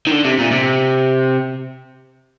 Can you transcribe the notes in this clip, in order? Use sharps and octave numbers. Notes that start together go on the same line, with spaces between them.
D#3
D3
C3
A#2
C3